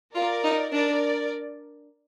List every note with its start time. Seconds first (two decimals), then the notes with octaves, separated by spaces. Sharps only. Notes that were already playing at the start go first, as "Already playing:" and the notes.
0.15 F4 A#4 D5
0.44 D#4
0.72 D4 A#4 D5